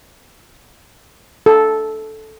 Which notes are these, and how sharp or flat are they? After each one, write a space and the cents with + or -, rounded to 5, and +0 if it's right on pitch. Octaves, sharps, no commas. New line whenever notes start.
A4 -10